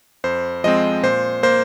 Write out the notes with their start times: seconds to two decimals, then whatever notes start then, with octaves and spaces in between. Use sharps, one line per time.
0.24 F2 C5
0.64 F3 G#3 C4 D#5
1.03 A#2 C5
1.43 A#3 C5